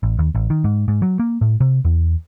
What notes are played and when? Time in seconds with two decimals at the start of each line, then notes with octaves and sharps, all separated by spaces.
0.03 A1
0.19 D#2
0.35 A1
0.50 D#3
0.64 G#2
0.88 G#2
1.02 F#3
1.19 A#3
1.41 A2
1.60 C3
1.85 E2